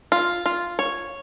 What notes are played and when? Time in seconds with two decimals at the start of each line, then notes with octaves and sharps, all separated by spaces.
0.12 F4
0.46 F4
0.79 C#5